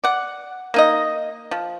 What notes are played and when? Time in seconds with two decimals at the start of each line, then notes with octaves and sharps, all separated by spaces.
0.04 D5 F#5
0.74 A#3 D#4 D#5
1.51 F3